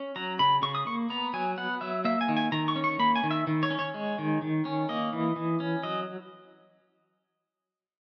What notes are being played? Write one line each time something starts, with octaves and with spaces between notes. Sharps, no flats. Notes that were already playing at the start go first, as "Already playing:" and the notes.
Already playing: C#4
F#3 A#5
C#3 B5
C#3 C#6
D#6
A#3 C#6
B3 A#5
F#3 G#5
B3 F#5
F#3 E5
A#3 E5
G#5
D#3
G#5
D#3 A#5
C#6
C#4
C#6
A#3 B5
G#5
D#3
E5
D#3
C#5
C#4
C#5
G#3
D#3
D#3
C#4
A#3 D#5
E3
E3
C#4
F#3 D#5